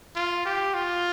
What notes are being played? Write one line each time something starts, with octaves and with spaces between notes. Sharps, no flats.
F4
G4
F4